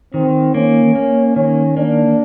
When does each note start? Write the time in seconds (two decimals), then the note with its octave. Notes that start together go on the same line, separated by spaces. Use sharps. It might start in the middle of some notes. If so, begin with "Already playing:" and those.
0.14 D#3 C4
0.54 A#3 C#4
0.95 A#3
1.36 D#3 C#4
1.77 A#3 D4